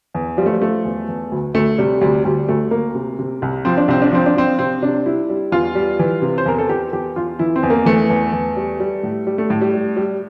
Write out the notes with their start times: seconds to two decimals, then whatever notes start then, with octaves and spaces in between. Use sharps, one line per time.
0.14 E2
0.37 F3 G3
0.46 A3
0.54 G3
0.61 F3 A3
0.85 E2
1.08 E2
1.32 D2
1.54 D2 A3
1.78 C3 G3
2.01 D2 G3
2.25 D2 G3
2.48 D2 A3
2.71 D2 A#3
2.95 C3
3.19 C3
3.42 C2
3.65 F3 C4
3.77 D4
3.88 C2 C4
4.02 D4
4.11 F3 C4
4.26 D4
4.35 F3 C4
4.59 C3 C4
4.82 C3 D4
5.06 G3 E4
5.30 G3
5.52 E2 F4
5.75 G3
5.99 E3
6.22 C3
6.38 C5
6.46 E2 A#4
6.58 A4
6.69 E2 G4
6.93 E2 G4
7.16 E2 F4
7.39 E3 E4
7.56 C4
7.63 E2
7.70 A#3
7.86 E3 A3
8.10 E2
8.33 E2
8.57 G3
8.80 G3
9.03 A2
9.27 G3
9.38 A3
9.50 A2
9.61 G3
9.74 G3
9.97 G3